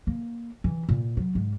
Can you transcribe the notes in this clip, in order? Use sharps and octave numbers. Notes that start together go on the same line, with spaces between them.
A#3
E3
A#2
F#3
G#2